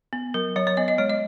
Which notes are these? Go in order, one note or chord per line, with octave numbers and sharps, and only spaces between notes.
B3
F#3 A#4
F#3 C#5
C#5
B3 D#5
D#5
G#3 C#5
D#5